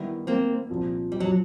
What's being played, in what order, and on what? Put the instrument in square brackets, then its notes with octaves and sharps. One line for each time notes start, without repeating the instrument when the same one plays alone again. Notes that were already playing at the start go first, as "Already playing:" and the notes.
Already playing: [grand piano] D#3 G3 B3 E4
[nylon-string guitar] A#3 C4
[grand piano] C2 A#2 F3
[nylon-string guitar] G3
F#3